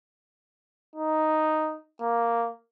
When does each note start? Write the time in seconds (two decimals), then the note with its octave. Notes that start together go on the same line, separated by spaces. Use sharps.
0.96 D#4
2.01 A#3